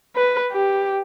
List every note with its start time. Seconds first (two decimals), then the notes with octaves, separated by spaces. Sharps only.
0.16 B4
0.52 G4